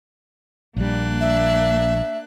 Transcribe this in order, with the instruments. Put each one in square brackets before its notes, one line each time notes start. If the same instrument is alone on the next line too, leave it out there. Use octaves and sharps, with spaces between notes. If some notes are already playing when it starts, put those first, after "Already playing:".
[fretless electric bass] A#1 G3 [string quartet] A#3 D4 F#6
[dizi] E5